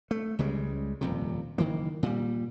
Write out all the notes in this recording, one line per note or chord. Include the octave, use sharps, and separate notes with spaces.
A3
C#2 C#3 G3 G#3
D#1 F2 C3
F#1 D#3 E3 A#3
A#2 G3